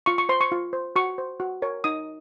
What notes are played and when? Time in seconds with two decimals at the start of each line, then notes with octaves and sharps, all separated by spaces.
0.06 F4 C#6
0.18 C#6
0.29 C5 C6
0.41 C#6
0.52 F4
0.73 C5
0.96 F#4 C#6
1.18 C5
1.40 F#4
1.62 A#4 C#5
1.84 D#4 D#6